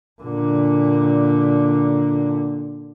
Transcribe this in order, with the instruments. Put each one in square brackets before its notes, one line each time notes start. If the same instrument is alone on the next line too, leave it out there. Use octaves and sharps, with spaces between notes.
[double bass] A#2 D3